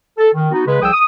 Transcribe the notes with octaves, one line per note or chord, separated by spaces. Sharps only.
A4
D#3
B3 D#4 F#4
C#3 G#3 B4
C2 F3 G#4 G5 D#6 E6
D#6